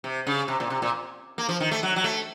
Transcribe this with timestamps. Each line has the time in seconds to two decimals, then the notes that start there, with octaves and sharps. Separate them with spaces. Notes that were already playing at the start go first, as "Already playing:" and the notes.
0.04 C3
0.27 C#3
0.48 C3
0.60 A#2
0.70 C3
0.82 A#2
1.38 A#3
1.49 F3
1.60 D#3
1.71 A3
1.83 F#3
1.96 F#3
2.04 A3